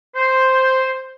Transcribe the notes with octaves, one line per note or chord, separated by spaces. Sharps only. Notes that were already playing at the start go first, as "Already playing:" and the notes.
C5